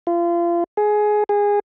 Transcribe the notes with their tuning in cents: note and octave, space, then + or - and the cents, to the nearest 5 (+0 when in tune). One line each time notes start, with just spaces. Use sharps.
F4 -30
G#4 +15
G#4 -20